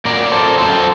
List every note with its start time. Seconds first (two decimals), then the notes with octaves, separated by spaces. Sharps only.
0.05 A#2 F#3 A#4 D5
0.32 A4 C5
0.58 F#2 F#3 A4 C5